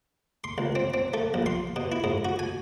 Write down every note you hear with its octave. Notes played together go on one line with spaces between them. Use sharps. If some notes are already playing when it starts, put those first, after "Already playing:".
C6
C#2
C4
C4
A3
A#1
C6
B2
E4
G#2
F#4
G#5